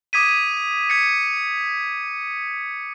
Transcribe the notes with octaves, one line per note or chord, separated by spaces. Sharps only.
D6 D#6 G#6 B6 D#7
G#6 B6 C#7